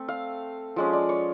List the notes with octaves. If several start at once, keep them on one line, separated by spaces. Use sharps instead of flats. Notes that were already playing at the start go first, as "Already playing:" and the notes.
Already playing: A3 C4
F5
F3 G#3 C#4
D5
C#5